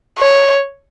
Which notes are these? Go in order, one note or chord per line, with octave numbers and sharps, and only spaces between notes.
C#5